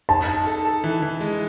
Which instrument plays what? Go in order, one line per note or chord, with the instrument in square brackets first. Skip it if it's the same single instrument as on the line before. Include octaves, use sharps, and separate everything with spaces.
[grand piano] D#4 [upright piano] A5
[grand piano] D#4
A4
A4
E3
E3
G#3